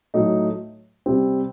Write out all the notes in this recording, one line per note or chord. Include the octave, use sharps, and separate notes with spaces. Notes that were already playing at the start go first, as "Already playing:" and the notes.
A2 F#3 A3 D#4
C3 G3 C4